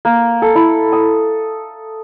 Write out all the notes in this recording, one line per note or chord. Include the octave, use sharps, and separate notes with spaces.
A#3
A4
E4
D#6